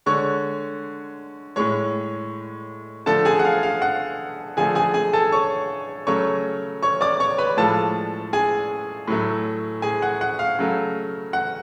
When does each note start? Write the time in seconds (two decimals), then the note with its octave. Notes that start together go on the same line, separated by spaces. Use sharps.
0.06 D3 G#3 C#5 C#6
1.56 A2 G#3 C#5 C#6
3.06 D3 F3 A3 A4 A5
3.25 G#4 G#5
3.39 F#5
3.45 F5
3.63 F5
3.82 F#5
4.57 D3 F3 A3 G#4 G#5
4.75 G#4 G#5
4.94 G#4 G#5
5.13 A4 A5
5.32 C#5 C#6
6.07 C#3 F#3 A3 C#5 C#6
6.83 C#5 C#6
7.01 D5 D6
7.20 C#5 C#6
7.38 B4 B5
7.57 A2 F3 G#3 A4 A5
8.33 G#4 G#5
9.07 A2 F#3 A3
9.82 G#4 G#5
10.02 F#5
10.21 F#5
10.39 F5
10.59 C#3 F#3 A3
11.33 F#5